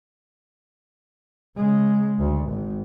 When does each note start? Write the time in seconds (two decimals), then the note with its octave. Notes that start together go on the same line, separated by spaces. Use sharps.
1.57 C#3 G#3
2.19 D2
2.50 G#1